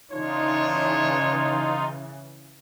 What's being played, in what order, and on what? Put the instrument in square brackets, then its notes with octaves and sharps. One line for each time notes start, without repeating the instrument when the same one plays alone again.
[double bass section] C#3 E3 [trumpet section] D4 C#5 [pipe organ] D#4 F4